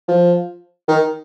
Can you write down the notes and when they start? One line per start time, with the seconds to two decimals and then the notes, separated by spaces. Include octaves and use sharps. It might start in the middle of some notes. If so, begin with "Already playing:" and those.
0.08 F3
0.88 D#3